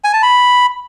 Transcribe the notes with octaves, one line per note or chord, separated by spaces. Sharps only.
G#5
A5
B5